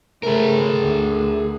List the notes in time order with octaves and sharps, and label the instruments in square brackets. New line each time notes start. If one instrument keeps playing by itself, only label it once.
[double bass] C#3 A3 [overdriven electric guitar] G#4 A#4
[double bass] D2 D3